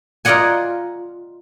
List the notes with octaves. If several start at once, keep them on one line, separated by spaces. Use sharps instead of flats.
F4 A#4 D5 D#5 F#5 G#5